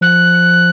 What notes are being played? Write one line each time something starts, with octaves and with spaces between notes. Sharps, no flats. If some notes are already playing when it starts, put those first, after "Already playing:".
F3 F#6